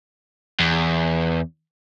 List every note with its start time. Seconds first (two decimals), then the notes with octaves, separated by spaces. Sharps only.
0.60 E2